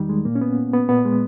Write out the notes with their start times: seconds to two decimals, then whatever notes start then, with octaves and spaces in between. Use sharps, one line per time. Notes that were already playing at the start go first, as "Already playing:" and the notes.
Already playing: E2 D#3 G3 D#4
0.09 G#3
0.25 A#2 A#3
0.35 C#4
0.41 B3
0.73 B3
0.89 A#2 B3
1.05 G#3